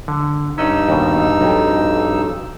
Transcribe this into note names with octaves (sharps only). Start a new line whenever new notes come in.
D3
G2 C#4 D#4 D#5 F#5 E6
D#2 B2
B1 F2